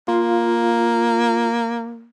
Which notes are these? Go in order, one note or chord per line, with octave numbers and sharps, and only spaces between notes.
A#3 F4